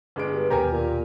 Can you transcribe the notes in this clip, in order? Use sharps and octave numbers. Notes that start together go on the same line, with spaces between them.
G1 G#3 D7
G2
D#2 B2 G4 A#4 G#5 A#5
A#2